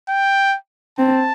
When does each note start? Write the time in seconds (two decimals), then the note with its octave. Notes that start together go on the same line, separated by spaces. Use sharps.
0.09 G5
0.99 C4 A5